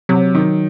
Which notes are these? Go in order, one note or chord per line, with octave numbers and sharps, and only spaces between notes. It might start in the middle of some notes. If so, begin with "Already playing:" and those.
C3 F#3
D#3